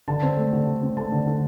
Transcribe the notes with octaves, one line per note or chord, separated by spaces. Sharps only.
D3 A5
C4
A3
D3
D3
C4
A3 A5
D3
D3